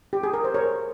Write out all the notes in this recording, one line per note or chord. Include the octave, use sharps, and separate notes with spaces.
G4
G#4
A#4
C5
A#4 C#5